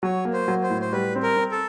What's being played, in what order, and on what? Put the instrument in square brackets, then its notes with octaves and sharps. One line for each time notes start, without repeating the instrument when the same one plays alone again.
[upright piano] F#3 [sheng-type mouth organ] C#5
[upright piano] A#3
[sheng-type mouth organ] C5
[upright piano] F#3
[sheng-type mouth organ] C5
[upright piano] A2
[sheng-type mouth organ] C5
[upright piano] G3 [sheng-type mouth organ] B4
[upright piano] C4
[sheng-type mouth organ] A#4
[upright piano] C4
[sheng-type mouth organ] A4